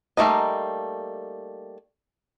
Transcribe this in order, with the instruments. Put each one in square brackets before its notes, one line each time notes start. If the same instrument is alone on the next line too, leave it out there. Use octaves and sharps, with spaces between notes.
[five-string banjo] G3 A3 A#3 D#4 D#5